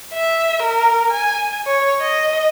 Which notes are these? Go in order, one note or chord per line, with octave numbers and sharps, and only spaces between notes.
E5
A#4
G#5
C#5
D#5